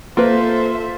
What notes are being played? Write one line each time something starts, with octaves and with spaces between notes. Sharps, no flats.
A#3 F4 A4 B4 C5 E5